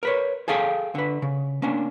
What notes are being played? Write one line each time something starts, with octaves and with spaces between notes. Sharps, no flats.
A#4 B4 C#5
G#4 A4 F5 G5 G#5
D3 B4
C#3
A#3 C#4 D4